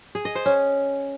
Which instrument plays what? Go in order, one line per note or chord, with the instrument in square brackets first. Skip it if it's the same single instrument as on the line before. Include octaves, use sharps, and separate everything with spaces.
[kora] G#4
D#5
C5
C#4